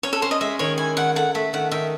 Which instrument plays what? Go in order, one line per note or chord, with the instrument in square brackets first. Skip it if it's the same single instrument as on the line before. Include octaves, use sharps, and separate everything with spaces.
[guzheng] C#4 [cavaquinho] C#5
[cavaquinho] A4
[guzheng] C#4 [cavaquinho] C5
[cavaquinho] D#5
[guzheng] G#3 [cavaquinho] E5
[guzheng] D#3 [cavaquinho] C#5
[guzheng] E4 [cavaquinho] G#5
[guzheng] D#3 [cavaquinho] F#5
[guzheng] A3 [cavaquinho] F#5
[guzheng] A3 [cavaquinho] E5
[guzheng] D#3 [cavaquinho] F#5
[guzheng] D#3 [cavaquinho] E5